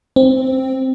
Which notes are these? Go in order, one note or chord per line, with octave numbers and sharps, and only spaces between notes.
C4